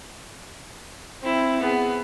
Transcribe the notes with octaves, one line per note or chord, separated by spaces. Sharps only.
C4 E4
B3 G#4